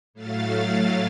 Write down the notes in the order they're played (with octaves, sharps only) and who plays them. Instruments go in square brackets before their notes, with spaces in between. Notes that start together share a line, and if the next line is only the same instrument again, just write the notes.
[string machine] A2 F#3 A3 F5 A6